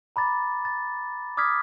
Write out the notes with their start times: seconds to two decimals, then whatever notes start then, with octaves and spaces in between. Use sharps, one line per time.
0.16 A#5 B5 D6 A6
0.65 A6
1.37 D6 D#6 F6 G#6 B6